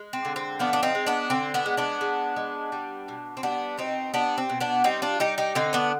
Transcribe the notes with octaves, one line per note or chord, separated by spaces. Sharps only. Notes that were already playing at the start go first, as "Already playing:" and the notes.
Already playing: G#3
C4
D3
C4
F3 B3 D4
D4
C4 D#4
G#3
B3 D4
D3 C4
B3 D4
G#3
B3 D4
G#3
G#3
G3
B2
C4
G3 B3 D4
B2 C4 D#4
G3 B3 D4
C4
B2
B3 D4
G3 C4 D#4
D4 F4
G3 D#4 G4
D#4 G4
D3 C4 D#4
B3 D4